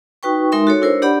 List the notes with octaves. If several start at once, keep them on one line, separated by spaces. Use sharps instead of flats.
D#4 F#4 B4 G5 C#6
G#3 D#4 A#4 E5 C6
F#4 A4 C#5
D4 E4 A#4 C5 C#5
D4 G4 D5 F#5 B5